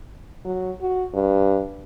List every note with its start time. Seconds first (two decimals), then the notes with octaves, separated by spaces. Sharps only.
0.45 F#3
0.81 F#4
1.14 G2